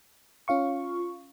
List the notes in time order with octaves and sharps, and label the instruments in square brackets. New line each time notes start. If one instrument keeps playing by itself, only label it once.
[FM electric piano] C#4 F4 F5 C#6